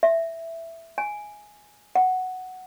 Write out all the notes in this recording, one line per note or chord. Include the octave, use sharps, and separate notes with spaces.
E5
G#5
F#5